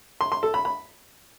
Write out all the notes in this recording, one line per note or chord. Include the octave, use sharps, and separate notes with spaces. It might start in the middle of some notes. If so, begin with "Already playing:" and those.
C6
C6
A4
B5
B5